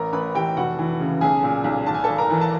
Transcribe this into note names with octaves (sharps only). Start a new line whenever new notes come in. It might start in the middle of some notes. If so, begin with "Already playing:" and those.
Already playing: A1 A#4 A#5
A1 B4 B5
E3 G4 G5
F1 F#4 F#5
E3
C#3
B1 G#4 G#5
A#2
B1
G#1 A5
G#5
G#1 A4 A5
A#4 A#5
E3
A5